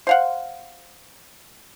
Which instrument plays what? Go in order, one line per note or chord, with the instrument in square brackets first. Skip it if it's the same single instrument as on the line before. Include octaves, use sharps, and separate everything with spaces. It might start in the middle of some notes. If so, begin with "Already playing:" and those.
[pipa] C5 F5 F#5